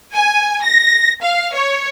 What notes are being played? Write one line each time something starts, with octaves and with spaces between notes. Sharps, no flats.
G#5
A#6
F5
C#5